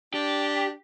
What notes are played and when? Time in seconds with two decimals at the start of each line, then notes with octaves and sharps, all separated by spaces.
0.14 D4 G4